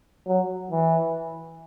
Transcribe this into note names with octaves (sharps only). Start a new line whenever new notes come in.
F#3
E3